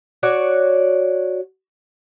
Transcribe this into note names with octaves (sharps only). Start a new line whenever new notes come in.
F#4 C#5 D5